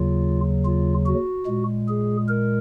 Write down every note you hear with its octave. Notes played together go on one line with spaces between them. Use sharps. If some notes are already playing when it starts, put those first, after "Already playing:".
Already playing: D#2 C#3 F#3 F4
F4
F#4
A#2 G#3
G#4
A#4